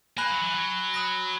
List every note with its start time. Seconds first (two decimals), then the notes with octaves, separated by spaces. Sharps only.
0.17 A#3 G#5 B5 F#6
0.30 F#3
0.42 E3
0.55 F#3
0.94 B5 D#6 F#6 A#6